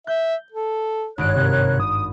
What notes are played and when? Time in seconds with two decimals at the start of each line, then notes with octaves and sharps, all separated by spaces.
0.07 E5 G6
0.52 A4
1.18 G#1 G2 C#5 F#6 D7
1.35 C3 A#4
1.80 D#6